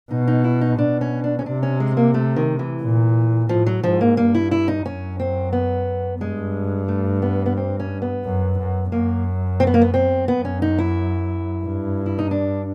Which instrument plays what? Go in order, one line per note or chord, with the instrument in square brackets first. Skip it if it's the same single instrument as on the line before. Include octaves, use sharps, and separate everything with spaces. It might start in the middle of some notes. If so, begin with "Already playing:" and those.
[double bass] B2 [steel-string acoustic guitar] D#4
[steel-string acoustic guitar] D#4
E4
D#4
[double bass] B2 [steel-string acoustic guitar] D4
[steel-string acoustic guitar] C#4
D4
C#4
[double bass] C3 [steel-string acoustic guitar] D4
[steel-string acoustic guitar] C#4
G#3
A#3
A3
D#3
E3
[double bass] A#2
[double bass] A2 [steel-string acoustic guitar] F3
[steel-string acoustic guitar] F#3
[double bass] G#2 [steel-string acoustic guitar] F3
[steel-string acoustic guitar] A#3
[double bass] G2 [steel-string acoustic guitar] A#3
[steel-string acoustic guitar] E4
E4
D#4
[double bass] F#2 [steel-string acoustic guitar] C#4
[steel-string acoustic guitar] C4
B3
[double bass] G2 [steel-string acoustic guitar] G#3
[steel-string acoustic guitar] A3
B3
B3
C4
C#4
B3
[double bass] F#2
F#2
[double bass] F#2 [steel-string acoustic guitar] A#3
[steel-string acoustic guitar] C4
B3
A#3
B3
C4
[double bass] F#2 [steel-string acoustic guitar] B3
[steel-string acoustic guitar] C#4
D#4
E4
[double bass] G2
[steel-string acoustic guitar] E4
D#4
D4